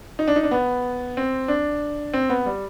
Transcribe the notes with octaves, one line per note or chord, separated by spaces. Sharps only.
D#4
D4
D#4
D4
B3
C4
D4
C4
B3
G3